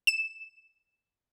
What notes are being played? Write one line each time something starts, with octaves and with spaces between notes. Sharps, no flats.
E7